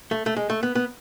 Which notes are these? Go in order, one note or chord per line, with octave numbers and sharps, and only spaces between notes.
A3
A3
G#3
A3
B3
B3